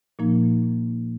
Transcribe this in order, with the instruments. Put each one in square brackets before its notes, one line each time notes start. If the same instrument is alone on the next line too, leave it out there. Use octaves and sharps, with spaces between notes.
[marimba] A#2 F3 A#3 D#4